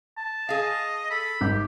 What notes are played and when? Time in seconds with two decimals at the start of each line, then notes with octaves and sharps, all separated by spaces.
0.17 A5
0.49 G#4 D#5 F5
1.10 A4 B5
1.41 G#1 G4